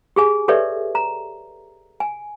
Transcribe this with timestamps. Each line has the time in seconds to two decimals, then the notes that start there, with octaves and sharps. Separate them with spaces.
0.16 G4 G#4 G#5
0.48 G4 A4 B4 C#5 D5 E5
0.95 A#5
2.00 G#5